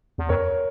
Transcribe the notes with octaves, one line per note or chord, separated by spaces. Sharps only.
E2
F2 A#4 C#5